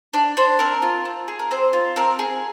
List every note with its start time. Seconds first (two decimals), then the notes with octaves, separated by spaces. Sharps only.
0.13 D4 D5
0.37 D4 C5
0.59 C4 A#4
0.82 F4
1.05 C4
1.28 G#4
1.39 A#4
1.51 C4 C5
1.73 F4
1.96 C4 A#4
2.19 G#4